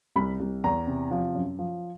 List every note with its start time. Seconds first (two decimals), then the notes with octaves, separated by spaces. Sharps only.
0.16 C2 B5
0.40 C2
0.64 E2 A#5
0.87 C3
1.11 F3
1.35 F#2
1.59 F3